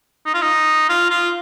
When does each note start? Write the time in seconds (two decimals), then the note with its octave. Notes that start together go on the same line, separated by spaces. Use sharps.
0.26 D#4
0.34 F4
0.42 D#4
0.89 F4
1.10 F4